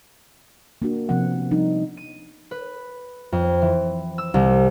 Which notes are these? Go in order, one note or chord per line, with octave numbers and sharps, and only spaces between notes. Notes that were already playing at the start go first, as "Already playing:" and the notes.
A#3 D4 F#4
C3 F3 B3 C4 F#5
F3 G3 D4 D#4
D#7
B4
F2
E3
E6
C2